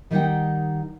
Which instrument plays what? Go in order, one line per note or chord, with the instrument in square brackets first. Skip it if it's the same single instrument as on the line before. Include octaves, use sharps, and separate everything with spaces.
[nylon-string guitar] D#3 G3 D#4 D5 F#5 G5